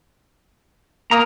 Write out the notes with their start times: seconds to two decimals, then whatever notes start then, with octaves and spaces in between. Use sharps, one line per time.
1.11 A#3 A#5 D#6